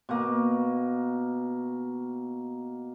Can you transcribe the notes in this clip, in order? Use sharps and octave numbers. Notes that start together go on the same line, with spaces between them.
B2 A#3